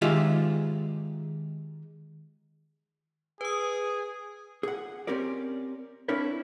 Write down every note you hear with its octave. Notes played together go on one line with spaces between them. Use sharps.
D#3 G#3 F4 G4 E5
G#4 B4 D#6
G#4 F#5
C4 C#4 G4 A#4 D5
C4 D4 E4 A#4 B4 C#5